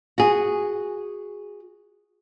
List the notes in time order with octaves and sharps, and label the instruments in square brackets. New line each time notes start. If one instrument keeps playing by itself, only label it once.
[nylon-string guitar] F#4 G#4